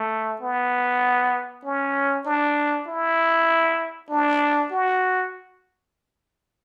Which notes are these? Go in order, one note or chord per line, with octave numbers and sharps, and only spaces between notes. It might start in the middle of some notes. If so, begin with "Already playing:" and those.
Already playing: A3
B3
C#4
D4
E4
D4
F#4